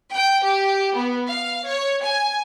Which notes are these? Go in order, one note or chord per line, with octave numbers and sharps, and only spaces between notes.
G5
G4
B3
F5
C#5
G#5